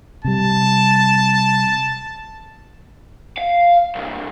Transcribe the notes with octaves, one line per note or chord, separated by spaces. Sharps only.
C3 G3 A5
F5
C2 G2